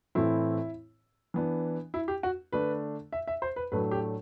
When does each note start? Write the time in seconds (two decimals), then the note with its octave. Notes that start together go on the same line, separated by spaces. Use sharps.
0.15 A2 E3 A3 C4 E4
1.34 E3 B3 D4
1.94 E4
2.08 G4
2.23 F#4
2.52 D3 A3 D4 B4
3.12 E5
3.27 E5
3.42 C5
3.56 B4
3.72 A2 F#3 A3 D4 B4
3.91 G4